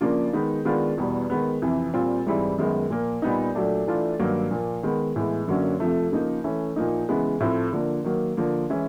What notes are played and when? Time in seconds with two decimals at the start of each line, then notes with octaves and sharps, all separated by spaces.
0.01 C#3 F3 A#3 D4 F4
0.33 D#3 G#3 B3 D#4
0.65 D#3 G#3 B3 D4 F4
0.97 E2 B2 G3
1.30 D#3 G#3 B3
1.62 F2 C3 E3
1.94 A#2 G3 C4 F4
2.26 G#2 E3 G3 C4 E4
2.58 F#2 D#3 G#3 B3
2.90 A#2 F3 A#3
3.22 A#2 G3 B3 D#4
3.55 A#2 F#3 A3 D4
3.87 E3 A3 D4 F4
4.19 G2 D#3 F#3 A#3
4.51 A#2 F3 A#3
4.83 D#3 G#3 B3
5.16 A2 E3 G#3 B3
5.47 F#2 D3 F#3 A#3 C#4
5.80 F2 C3 F3 A3
6.12 C#3 F3 A#3 D#4
6.44 E3 A3 C#4
6.76 A#2 F3 A#3 D#4
7.09 C#3 E3 G#3 B3
7.40 A2 F3 A3 C4
7.73 D3 F3 A#3
8.04 D#3 F#3 A#3
8.37 D3 F3 A#3
8.70 E3 G#3 C#4 E4